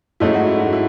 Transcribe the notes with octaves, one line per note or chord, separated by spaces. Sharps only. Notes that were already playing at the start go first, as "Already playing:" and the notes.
G#2 F#3 A3 C#4 E4
F#4
E4
F#4
E4